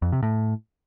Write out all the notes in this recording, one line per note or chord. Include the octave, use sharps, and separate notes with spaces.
F2
C3
A2